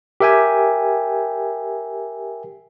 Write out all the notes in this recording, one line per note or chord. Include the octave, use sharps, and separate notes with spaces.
G4 A#4 E5 G5 G#5